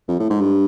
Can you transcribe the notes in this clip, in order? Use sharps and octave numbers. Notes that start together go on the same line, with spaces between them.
F2
A2
G#2
G2